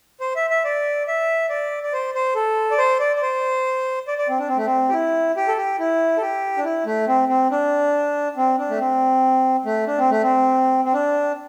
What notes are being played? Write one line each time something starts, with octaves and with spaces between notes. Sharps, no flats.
C5
E5
E5
D5
E5
D5
D5
C5
C5
A4
D5
C5
D5
D5
C5
D5
D5
C4
D4
C4
A3
C4
G4
E4
G4
A4
G4
E4
A4
G4
D4
E4
A3
C4
C4
D4
C4
D4
A3
C4
A3
D4
C4
A3
C4
C4
D4